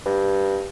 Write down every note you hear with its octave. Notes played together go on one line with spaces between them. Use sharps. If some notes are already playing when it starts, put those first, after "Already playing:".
G2